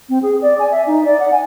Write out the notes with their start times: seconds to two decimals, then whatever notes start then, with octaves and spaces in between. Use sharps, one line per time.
0.09 C4
0.23 G#4
0.42 D5
0.59 G#5
0.71 E5
0.87 D#4
1.05 D5
1.20 F#5
1.32 G#5